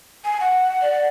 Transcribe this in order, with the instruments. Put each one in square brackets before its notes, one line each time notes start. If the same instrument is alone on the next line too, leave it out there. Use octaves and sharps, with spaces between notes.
[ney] G#5
F#5
[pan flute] D5